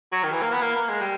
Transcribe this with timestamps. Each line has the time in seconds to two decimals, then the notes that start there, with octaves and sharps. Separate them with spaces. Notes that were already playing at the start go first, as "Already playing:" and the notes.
0.12 F#3
0.23 D#3
0.32 E3
0.42 A#3
0.52 B3
0.62 A#3
0.76 A#3
0.89 G#3
1.01 G3